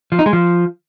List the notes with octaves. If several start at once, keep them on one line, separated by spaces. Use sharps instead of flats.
F3
D#4
G#3
F3